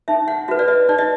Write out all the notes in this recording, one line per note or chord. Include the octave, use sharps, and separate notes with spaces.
D#4 E5
F#5
F#4 B4 E5
D5
D#5
D#4 D5
D#5